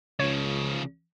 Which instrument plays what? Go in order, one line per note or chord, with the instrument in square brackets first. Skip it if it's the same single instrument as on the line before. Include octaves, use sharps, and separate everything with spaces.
[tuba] C#2 [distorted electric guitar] C#3 F3 [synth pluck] C#5